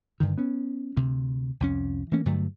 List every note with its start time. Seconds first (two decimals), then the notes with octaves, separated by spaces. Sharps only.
0.20 G2 D3 D#3
0.38 B3 C#4
0.97 D2 C3
1.60 C2 F2 C#4
2.12 E3 A3 A#3 C#4
2.26 G2 D3 F#3 A3